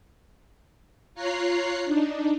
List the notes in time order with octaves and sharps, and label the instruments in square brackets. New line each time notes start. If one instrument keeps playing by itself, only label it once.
[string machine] F4 C#5 A#5 F#6 C7
D4 D#4